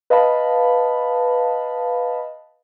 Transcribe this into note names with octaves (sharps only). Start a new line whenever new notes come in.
B4 D#5 F5 A5 B5